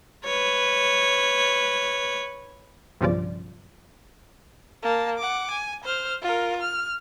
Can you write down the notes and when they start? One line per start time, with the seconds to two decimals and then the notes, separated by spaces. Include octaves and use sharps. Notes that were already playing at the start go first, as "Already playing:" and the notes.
0.25 B4 C#5
3.01 B1 G2 C#3 F3 D5
4.83 A#3 A5
5.18 F#5 D6
5.50 G#5
5.84 C5 F6
6.22 F4 A#4
6.61 F6